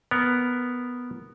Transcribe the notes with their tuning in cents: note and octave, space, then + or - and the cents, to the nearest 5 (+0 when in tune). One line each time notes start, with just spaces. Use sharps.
B3 +0 A#4 +0